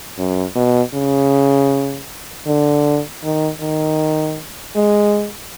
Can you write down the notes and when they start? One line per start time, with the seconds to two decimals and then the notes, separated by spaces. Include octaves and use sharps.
0.18 F#2
0.55 B2
0.94 C#3
2.47 D3
3.23 D#3
3.60 D#3
4.75 G#3